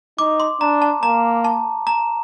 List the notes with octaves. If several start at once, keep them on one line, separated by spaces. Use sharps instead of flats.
D#4 D6
C6
D4 A#5
A5
A#3 A#5
A5
A#5